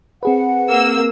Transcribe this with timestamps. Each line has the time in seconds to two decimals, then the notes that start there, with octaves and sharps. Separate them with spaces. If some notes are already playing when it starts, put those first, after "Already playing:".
0.23 C4 G#4 B4 F#5
0.69 A#3 E6